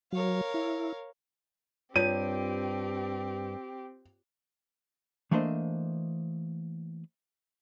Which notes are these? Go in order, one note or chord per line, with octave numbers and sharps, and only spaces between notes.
F#3 A#4 C#5 F5
E4
G2 C4 F4 G4 C#5 D#6 D#7
E3 A3 A#3 D4 C5 D#5